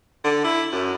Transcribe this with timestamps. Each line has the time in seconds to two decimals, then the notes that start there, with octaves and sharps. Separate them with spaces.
0.24 D3
0.44 E4
0.73 F#2